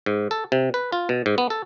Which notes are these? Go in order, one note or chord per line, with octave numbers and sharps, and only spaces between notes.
G#2
A4
C3
B4
F4
B2
G#2
B3
A4